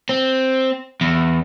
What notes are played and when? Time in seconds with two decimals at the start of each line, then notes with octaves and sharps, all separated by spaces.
0.09 C4
1.01 E2